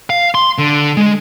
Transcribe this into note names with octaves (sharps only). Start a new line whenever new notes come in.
F5
C6
D3
G#3